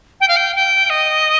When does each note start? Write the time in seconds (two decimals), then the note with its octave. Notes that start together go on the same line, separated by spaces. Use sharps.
0.20 G5
0.28 F5
0.36 G5
0.55 G5
0.89 D#5